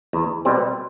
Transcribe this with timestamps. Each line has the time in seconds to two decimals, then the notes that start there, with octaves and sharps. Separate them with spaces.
0.13 E2
0.45 B2 G3 C4